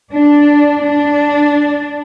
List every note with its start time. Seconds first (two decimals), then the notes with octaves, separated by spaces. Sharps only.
0.13 D4
0.84 D4